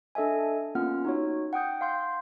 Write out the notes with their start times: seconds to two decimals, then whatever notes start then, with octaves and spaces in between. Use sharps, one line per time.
0.15 D4 A4 D#5 E5 G#5
0.75 A#3 B3 C#4 F4 F#5 F6
1.05 D#4 F#4 C#5
1.53 F#5 G5 D#6 G6
1.81 F5 C6 G6